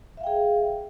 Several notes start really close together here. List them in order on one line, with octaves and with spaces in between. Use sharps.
E5 F5 G5 G#4